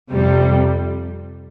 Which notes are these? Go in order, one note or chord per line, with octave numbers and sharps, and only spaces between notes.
F2 C3 G3